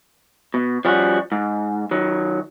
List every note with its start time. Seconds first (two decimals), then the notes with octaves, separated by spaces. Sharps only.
0.54 B2
0.85 F3 G3 C#4 F4 F#4
1.32 G#2
1.91 D#3 F#3